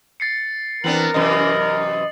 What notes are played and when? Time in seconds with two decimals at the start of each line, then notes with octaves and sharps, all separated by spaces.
0.20 A6 C7 C#7
0.84 E3 B3 C4 D4 A#4 F#7
1.14 F#2 C3 E3 D#5